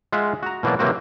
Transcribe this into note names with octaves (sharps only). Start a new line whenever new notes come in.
G#3 F4 E5 F#5
F#4 A#5
B2 E3 F#3 A#3 D5
C3 E3 F#3 A#3 C4 F#4